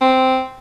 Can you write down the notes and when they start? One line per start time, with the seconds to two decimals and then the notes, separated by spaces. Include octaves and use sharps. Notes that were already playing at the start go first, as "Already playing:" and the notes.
0.01 C4